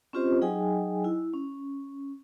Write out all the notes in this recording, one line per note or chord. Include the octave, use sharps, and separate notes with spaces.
C4 C#4 F4 G4 C5 D#5
F#3 D#4 G#4 D#5 G5 G#5
E4
C#4